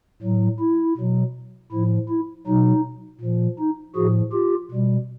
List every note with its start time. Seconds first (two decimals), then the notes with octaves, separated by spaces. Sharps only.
0.22 A2 F#3
0.59 E4
0.97 B2 F#3
1.71 A2 F3 E4
2.09 E4
2.47 B2 F#3 D#4
3.21 A#2 F3
3.59 D#4
3.95 A2 F3 F#4 G#4
4.32 F4 G4
4.71 B2 G3